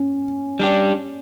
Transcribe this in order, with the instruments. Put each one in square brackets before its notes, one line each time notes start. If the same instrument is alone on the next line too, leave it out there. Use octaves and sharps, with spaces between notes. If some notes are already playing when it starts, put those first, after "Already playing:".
Already playing: [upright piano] C#4
[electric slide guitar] G3 D4 G4